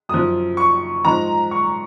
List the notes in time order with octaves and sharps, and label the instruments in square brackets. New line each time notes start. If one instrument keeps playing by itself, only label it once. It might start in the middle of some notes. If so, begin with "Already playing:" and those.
[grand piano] F#2 F3 D#6
C#6
G#2 F3 A#5
C#6